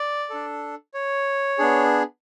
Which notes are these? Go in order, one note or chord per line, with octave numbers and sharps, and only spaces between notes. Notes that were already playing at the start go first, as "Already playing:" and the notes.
Already playing: D5
D4 A4
C#5
B3 D4 G#4